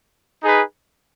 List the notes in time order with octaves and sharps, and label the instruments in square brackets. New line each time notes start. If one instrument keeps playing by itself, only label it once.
[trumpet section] D#4 G#4 B4